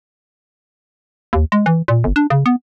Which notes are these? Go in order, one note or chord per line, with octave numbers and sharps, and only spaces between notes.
D#2
G#3
E3
A#2
G1
D4
C#3
B3